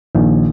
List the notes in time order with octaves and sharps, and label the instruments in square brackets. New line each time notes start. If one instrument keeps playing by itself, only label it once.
[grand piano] A#1 [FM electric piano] D#3